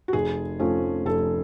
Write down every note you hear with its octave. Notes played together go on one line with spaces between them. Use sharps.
F#4
F1 G#4
F2 F3 A3 C#4
F1 A4